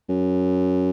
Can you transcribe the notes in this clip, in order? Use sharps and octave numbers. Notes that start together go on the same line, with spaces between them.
F#2